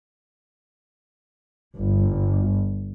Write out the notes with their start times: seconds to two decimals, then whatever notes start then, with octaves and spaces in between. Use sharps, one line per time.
1.77 G1